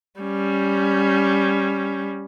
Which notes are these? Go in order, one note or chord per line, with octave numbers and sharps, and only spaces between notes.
G3 C#4